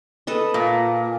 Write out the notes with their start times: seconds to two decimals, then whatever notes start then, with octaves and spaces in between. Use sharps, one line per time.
0.27 A4 B4 D#5
0.54 A#2